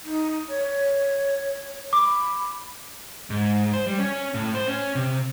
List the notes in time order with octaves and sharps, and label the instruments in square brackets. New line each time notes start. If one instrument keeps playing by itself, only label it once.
[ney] D#4
C#5
[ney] B5 [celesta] D6
[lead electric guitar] G#2
C5
G3
C#4
A2
C5
C#4
C3